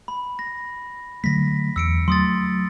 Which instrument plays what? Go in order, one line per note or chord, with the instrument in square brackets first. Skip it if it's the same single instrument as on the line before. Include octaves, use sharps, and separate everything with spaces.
[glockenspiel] B5
A#6
[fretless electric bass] D3 F#3 A3 [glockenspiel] A#6 B6
[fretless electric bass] E2 [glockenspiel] E6 C#7 D7
[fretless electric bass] F#3 A3 [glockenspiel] C6 D#6 A6